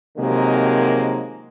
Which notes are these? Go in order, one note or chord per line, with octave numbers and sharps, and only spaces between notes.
C3 D#3 F3 F#3 G#3 A#3